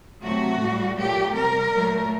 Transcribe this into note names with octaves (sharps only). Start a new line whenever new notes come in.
C3 F#3 A3 F#4
A2 G3
A#2 F#3 A3 G4
C3 G3 A#4
A#2 F#3 A3